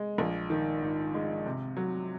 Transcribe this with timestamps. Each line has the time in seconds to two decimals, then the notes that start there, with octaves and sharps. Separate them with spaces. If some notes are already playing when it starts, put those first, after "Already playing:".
Already playing: G#3
0.18 A#1
0.50 D#3
0.82 G#2
1.14 G#3
1.46 C3
1.76 F#3